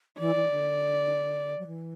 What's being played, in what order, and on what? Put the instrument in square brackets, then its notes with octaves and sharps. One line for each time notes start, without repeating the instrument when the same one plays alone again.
[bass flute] E3 [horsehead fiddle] D5
[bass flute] E3
D3
F#3
E3